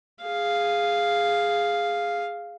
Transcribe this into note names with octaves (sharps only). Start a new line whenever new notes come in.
G#4 F5